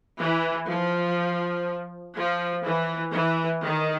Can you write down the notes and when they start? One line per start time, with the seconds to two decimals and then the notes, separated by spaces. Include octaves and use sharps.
0.20 E3
0.69 F3
2.16 F3
2.64 E3
3.13 E3
3.62 D#3